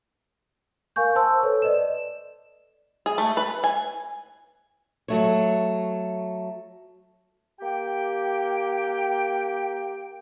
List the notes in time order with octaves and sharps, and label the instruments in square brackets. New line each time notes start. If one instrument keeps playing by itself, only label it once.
[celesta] A#4 F5 G#5 C#6 G6
C5 A5 C6 E6
A4 B4 C#5
D5 D#5 E7
[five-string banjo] G#4
A3
B4
G#5
[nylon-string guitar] F#3 A3 C#5
[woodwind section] A#3 G4 G5